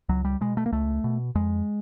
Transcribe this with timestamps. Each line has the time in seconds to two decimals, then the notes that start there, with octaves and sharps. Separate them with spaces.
0.09 C#2 F#3
0.25 G3
0.41 B2 G#3
0.57 A3
0.66 A#3
0.72 C#2 A3
1.04 B2
1.35 F2 G#3